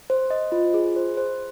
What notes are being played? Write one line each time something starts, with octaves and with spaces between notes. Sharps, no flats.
C5
D#5
F4
G#4
C5
C5